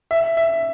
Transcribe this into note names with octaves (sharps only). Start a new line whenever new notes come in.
E5
E5